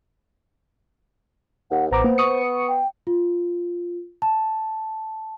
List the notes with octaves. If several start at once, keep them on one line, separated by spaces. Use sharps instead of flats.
D#2 F#5
A1 B3 C5 A#5 D6
A#3 A#4
C#6 D#6 C#7
G5
F4
A5